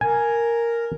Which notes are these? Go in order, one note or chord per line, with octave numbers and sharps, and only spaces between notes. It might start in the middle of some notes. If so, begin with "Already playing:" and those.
A#4 G#5